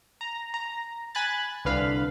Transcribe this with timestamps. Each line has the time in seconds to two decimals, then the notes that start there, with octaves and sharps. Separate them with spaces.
0.21 A#5
0.54 A#5
1.15 G#5 B5 F#6 A6
1.65 C2 D3 B4 F5 B5